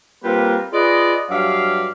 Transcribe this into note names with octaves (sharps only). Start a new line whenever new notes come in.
G3 A#3 C4 F4 A#4 B4
F4 G#4 B4 D5 D#5
G2 F#3 D5 E5 F5